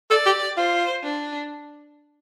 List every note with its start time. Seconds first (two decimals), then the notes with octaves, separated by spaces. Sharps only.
0.11 A4 D5
0.26 G4
0.57 F4 C5
1.03 D4